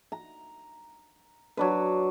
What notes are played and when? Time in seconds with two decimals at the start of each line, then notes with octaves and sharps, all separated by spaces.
0.12 A#5
1.57 F#3 D4 B4